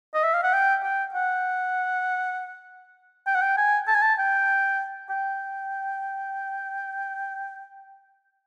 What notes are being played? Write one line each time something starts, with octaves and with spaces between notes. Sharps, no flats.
D#5
E5
F5
F#5
G5
G5
F#5
G5
F#5
G5
G#5
A5
G#5
A5
G5
G5